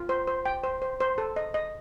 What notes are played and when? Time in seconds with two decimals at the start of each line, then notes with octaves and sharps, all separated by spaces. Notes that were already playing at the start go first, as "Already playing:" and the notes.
Already playing: F4
0.09 C5
0.27 C5
0.46 G5
0.64 C5
0.82 C5
1.00 C5
1.18 A4
1.36 D#5
1.54 D#5